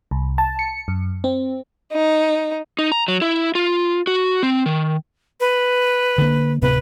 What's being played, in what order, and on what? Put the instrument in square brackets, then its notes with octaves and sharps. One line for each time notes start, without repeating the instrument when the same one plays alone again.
[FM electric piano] C2
A5
C#7
F#2
C4
[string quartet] D#4
[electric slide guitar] D#4
A#5
F#3
E4
F4
F#4
C4
D#3
[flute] B4
[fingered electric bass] D3 A#3
[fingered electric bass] D1 C3 B3 [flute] B4